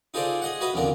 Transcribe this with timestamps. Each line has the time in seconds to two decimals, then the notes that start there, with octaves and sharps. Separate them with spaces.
0.14 D#4 F4 G#4 A4 C5 D5
0.42 G#4 D#5 F#5
0.61 F#4 B4 D#5 E5
0.74 A1 E2 A#2 D3 C4 A#4